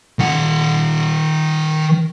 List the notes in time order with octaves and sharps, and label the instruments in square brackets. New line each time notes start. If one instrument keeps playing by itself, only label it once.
[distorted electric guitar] D#3 F#5